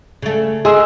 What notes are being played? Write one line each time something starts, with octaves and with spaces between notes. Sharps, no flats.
C#3 A3
G#3 G#4 E6